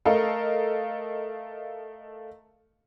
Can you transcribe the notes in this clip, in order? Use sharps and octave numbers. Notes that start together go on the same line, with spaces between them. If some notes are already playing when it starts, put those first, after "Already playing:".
A3 A4 A#4 D#5 F5